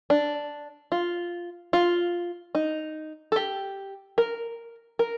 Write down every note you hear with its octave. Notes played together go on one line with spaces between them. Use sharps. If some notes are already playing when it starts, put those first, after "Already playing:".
D4
F4
F4
D#4
A4
G4
A#4
A#4